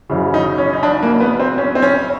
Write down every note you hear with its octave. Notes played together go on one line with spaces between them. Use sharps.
F#1 F#2 C#3 E3
D#4
C#4
D#4
D4
A#3
B3
C4
C#4
C4
C#4